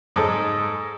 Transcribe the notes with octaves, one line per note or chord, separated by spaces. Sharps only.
G#2 G#3 A4 C5